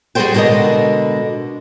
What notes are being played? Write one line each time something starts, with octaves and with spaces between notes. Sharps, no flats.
G3 F#4 G#4 A4 C5 G5
B2 D3 G#3 A#4 D#5